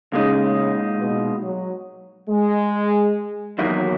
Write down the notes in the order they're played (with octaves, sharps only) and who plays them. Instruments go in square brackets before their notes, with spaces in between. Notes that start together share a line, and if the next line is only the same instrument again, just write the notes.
[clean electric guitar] A#2 G#3 D#4 [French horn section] C#3
[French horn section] B2
F#3
G#3
[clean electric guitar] E2 D#3 A#3 E4 [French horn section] F#3